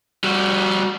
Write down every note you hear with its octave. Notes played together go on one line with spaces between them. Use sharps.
G3 F#4